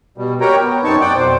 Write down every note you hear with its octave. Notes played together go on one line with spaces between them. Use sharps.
B2 G3
F#4 G4 A#4 C#5 G5 A#5
B3
F#2 C4 D#4 C#5 A5 C#6
D5 F#5 G5 D6
F2 B2 C5